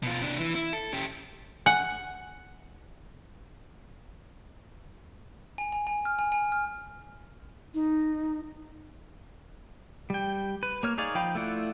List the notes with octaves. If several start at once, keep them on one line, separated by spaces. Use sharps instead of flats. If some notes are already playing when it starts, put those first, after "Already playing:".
B2 F4
C3 D4
E3
E4
A4
C#4 G4
F#5 G#5
G#5
G#5
G#5
F6
G#5
G#5
F6
D#4
G3 G5
B4
A#3 C#5 F6
D#4 G#4 C#5 D5 F5
F3 D#4 F5 G5 B5
A3 E4 F4 D5 F#5